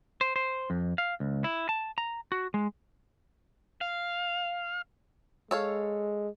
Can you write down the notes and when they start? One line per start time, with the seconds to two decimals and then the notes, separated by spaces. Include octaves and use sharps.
0.21 C5
0.36 C5
0.70 F2
0.98 F5
1.20 C#2
1.44 E4
1.69 A5
1.98 A#5
2.32 F#4
2.54 G#3
3.81 F5
5.51 G#3 A4 C#5 F5